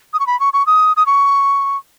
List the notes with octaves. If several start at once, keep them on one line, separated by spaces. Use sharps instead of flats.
D#6
C#6
B5
C#6
C#6
D#6
D#6
C#6